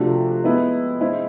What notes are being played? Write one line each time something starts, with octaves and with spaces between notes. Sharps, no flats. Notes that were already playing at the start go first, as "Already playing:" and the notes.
Already playing: C3 F3 A3 D4 F#4
G#3 B3 E4
G#3 C4 E4